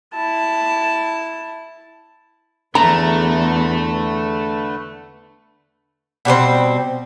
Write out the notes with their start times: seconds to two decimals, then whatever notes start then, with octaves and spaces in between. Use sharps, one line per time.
0.14 E4 A5
2.75 E2 D3 A3 B4 A#5
6.25 B2 G3 A3 C4